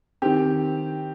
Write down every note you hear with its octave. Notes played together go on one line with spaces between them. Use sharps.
D#3 C4 G4